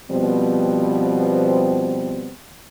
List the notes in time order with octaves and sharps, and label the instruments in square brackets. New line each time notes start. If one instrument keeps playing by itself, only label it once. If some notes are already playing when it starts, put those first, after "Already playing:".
[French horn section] B2 F3 G3 B3 C4